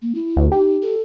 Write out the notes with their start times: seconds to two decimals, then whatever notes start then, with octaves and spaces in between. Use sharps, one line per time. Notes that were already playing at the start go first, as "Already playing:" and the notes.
0.02 A#3
0.15 E4
0.36 D2
0.52 D#4 G4
0.82 A4